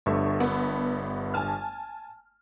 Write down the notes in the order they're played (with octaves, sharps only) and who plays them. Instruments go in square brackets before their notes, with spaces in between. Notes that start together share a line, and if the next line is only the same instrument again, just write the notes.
[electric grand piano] G1 G2 E5 [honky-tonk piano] A3 C#6
[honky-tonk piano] B3
G#5 A5 F6